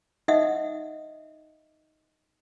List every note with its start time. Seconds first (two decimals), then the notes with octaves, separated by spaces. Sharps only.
0.28 D#4 D#5 E5 F#5 D#6